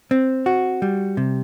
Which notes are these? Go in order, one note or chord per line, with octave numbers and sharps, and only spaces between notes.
C4
F#4
G3
C3